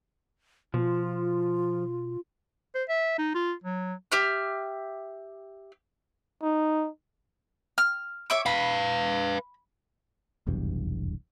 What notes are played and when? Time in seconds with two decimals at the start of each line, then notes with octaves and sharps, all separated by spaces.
0.74 B2 F3 F4
2.75 C5
2.89 E5
3.18 D#4
3.34 F4
3.64 F#3
4.12 G4 E5 F6
6.43 D#4
7.78 F6
8.30 C#5 E5 D6
8.46 B4 F5 B5
10.47 F1 B1 E2 G2